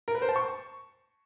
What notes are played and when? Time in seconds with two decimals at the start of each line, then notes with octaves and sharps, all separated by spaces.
0.08 A#4
0.15 B4
0.22 C5
0.29 A5
0.36 C#6